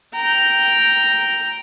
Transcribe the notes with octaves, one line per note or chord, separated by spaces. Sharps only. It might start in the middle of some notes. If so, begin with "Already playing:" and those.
G5 A#5